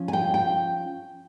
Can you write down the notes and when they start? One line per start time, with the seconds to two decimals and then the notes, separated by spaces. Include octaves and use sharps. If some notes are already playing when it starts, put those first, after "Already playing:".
Already playing: F3 C#4
0.08 G#5
0.13 G5
0.34 G5